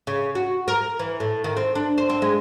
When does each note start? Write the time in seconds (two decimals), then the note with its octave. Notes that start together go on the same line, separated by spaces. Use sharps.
0.07 C#3
0.35 F#4
0.68 A#4
0.99 E3
1.20 A2
1.44 D#3
1.57 C4
1.75 D4
1.98 C5
2.10 C4
2.22 G#3